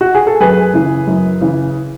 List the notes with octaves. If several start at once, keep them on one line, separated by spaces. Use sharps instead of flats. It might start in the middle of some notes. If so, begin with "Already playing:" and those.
F#4
G#4
A4
F#2 G#4 B4
C#3 E3
F#2
C#3 E3